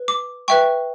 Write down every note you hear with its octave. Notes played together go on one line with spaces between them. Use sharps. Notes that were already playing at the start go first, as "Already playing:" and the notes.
Already playing: B4
D6
B4 E5 G5 C#6